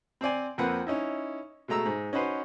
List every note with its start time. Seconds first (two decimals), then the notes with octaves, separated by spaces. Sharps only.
0.21 C4 C5 D5 G#5
0.58 F2 A#3 C4 B4 F#5
0.87 C#4 D#4 E4
1.68 B2 G#3 A3 A#5 E6
1.86 G#2
2.13 C#4 D#4 F#4 B4 C5